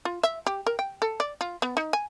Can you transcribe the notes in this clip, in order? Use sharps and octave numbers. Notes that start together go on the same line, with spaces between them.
F4
E5
G4
A#4
G5
A4
D5
F4
B3
D#4
G#5